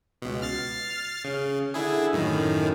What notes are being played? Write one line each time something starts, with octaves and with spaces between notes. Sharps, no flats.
C#2 B2
F6 A6 C7
C#3
D3 E4 G#4
F#2 A2 D#3